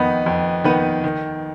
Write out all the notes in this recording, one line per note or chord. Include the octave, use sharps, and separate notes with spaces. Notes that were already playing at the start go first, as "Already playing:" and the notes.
Already playing: F2 D#3 B3 D#4 B4
F2
D#3 B3 D#4 B4
D#3